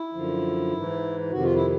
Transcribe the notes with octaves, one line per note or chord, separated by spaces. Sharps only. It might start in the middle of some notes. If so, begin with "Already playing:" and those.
Already playing: E4
F#2 D3 F3
G#2 E3
F2 C3 D#3 F#4
F4
E4